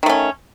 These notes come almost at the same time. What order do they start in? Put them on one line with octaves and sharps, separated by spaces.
D#3 A3 C#4